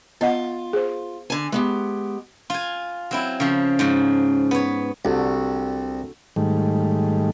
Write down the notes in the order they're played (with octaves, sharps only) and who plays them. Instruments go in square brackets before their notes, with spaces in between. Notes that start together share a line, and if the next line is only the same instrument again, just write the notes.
[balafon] B3 D#5 F#5 [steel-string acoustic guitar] F4
[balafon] G#4 C5
[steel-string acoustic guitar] D3 G#5
G#3 B3 G4
[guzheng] F4 G#5
F#3 C4 E4
C#3 F3
G#2 C#3
B3 C#5
[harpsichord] C2 [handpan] D4 F#4 A4
[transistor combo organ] G#2 D#3 G3 A3